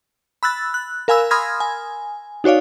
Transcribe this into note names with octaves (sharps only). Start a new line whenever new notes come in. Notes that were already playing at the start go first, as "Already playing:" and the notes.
B5 E6 F#6 A6
F#6
A#4 F5 G#5 B5 E6
B5 C6 D#6 F6 G#6 A#6
G#5
D#4 F#4 C#5 D5 F5